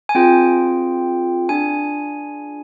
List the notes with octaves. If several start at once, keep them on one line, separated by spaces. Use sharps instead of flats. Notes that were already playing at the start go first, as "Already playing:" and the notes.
G#5
C4 F4 G#4 G5
D4 F4 G#4 G#5